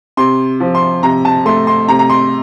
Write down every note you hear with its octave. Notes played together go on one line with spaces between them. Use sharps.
C3 C6
F3
C6
C3 A#5
A5
A3 C6
C6
C3 A#5
A#5
C6